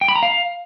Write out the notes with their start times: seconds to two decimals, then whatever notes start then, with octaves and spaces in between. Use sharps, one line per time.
0.01 G5
0.08 B5
0.16 A#5
0.23 F5